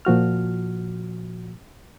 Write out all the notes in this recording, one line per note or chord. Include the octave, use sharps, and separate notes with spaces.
A#2 F3 F#4 F6